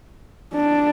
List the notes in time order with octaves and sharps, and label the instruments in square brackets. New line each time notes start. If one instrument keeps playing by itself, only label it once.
[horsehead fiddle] D4